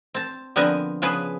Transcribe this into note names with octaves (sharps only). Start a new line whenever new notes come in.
C4 A5
D3 F3 B3 C4 A#4 G#5
C#3 F3 B3 G#4 B4